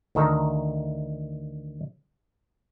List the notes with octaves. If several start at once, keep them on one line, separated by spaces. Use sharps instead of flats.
D2 D#3 A4 A#5